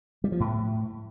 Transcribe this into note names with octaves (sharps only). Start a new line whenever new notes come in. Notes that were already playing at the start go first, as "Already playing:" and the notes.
G3
F3
A2